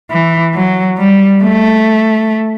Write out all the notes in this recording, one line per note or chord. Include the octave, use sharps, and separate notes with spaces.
E3
F#3
G3
A3